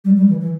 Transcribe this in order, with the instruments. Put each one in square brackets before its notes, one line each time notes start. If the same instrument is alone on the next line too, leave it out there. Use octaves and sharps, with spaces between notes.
[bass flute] G3
G3
E3
E3